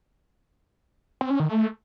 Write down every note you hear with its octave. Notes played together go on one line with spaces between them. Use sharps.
C4
C#4
D#3
A3